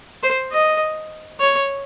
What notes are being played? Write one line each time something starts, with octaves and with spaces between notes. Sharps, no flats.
C5
D#5
C#5